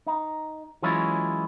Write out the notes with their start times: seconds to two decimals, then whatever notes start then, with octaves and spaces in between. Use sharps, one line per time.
0.07 D#4
0.82 E3 F#3 G#3 C#4 E4 F4